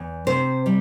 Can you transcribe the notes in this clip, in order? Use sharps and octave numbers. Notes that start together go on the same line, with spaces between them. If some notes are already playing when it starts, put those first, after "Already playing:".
Already playing: E2
C3 C5
G3